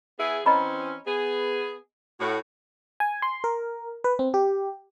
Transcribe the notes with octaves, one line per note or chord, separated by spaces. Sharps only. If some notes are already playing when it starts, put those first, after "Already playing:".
B3 E4 G#4
E3 C4 C#4 D#5 A#5 B5
B3 G#4
A2 F#4
G#5
C6
A#4
B4
C4
G4